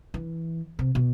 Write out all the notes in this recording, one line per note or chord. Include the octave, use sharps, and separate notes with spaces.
E3
C3
B2